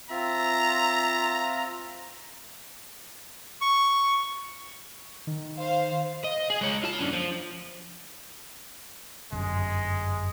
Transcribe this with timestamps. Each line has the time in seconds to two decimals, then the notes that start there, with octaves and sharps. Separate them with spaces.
0.10 C4 F4 E5 A#5
3.61 C#6
5.27 D#3
5.59 C5 F5
6.24 D#5
6.50 G#4
6.61 G#3 C#5
6.84 F4 A5
6.99 F#2 D3
7.13 F3
9.32 G1 F#2 G#3